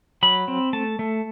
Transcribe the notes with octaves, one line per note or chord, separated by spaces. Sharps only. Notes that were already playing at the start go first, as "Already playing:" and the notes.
F#3 B5
C4
A3 A5
A3